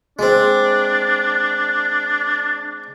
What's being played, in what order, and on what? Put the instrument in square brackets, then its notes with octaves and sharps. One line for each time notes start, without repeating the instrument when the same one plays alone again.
[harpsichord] G#3 C4 [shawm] D4